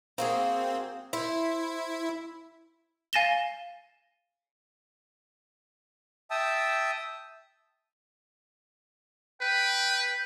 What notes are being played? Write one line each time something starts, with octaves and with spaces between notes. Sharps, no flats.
A#3 C4 F#4 G#4
E4 C5 E5
F5 G#5 A6 A#6 E7 G7
E5 G5 A5 D#6 E6
B4 G5